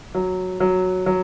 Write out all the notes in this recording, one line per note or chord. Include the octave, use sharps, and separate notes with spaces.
F#3
F#3
F#3